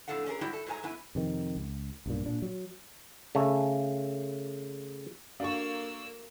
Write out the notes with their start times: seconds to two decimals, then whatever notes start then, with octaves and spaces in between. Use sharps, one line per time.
0.08 F2 A2 D4 A4 F5 F#5
0.26 C#4 D4 G#4 A#4
0.41 G#2 G3 E4 F#4 G5
0.53 A4
0.67 G#2 F#3 G#3 A4 G#5 A#5
0.83 F#2 B3 E4 G#5
1.15 F2 C3 D#3
1.57 C#2
2.06 B1 G2 A#2
2.26 A#2 D4
2.42 F#3
3.35 C#3 A3
5.40 A#3 D4 F#4 A4 F5 C#6 E6